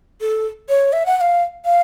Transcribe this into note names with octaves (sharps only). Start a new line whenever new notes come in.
A4
C#5
E5
F#5
F#5
F5
F5